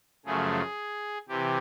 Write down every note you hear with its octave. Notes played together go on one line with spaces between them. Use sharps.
F#2 C#3 F3 A3 G#4
C3 E3 G4